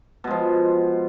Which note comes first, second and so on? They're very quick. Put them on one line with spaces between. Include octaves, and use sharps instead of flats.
B2 G#3 F3